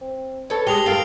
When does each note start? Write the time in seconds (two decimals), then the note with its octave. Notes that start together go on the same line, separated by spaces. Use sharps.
0.01 C4
0.50 A4 B4 C#5
0.67 G#3 G4 D#6 F7 G7
0.86 G2 A4 A#4 F5 C7 D7